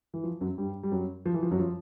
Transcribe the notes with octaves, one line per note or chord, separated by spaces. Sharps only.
E3
F3
F#2 F#3
G2 G3
G3
F#2 F#3
F3
E3
F3
F#2 F#3
F3